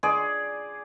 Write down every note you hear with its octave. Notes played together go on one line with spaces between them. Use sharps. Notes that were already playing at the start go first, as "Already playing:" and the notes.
G#4 D5